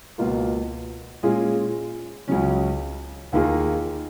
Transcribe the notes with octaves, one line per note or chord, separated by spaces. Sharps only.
C#2 B2 A#3 F4
A#2 G#3 C#4 F4 G#4
C#2 C#3 F#3 C#4
D#2 D#3 A#3 F4 G#4